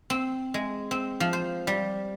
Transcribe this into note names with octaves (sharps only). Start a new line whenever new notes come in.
C4
G#3
C4
F3
C5
G3